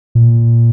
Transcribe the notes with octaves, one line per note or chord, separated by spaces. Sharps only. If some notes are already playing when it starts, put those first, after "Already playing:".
A#2